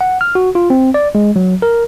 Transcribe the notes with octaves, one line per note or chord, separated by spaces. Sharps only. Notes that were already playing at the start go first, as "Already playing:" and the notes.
F#5
F6
F#4
F4
C4
D5
G#3
F#3
A#4